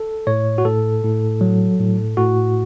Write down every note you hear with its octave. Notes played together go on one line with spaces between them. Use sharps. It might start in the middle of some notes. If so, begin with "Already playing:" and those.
Already playing: A4
A2 C#5
F#4
A2 A4
A2
F#3
A2
A2 F#4